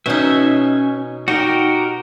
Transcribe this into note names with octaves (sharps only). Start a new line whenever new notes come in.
B2 C#4 D#4 E5
D#4 F#4 G4 A#4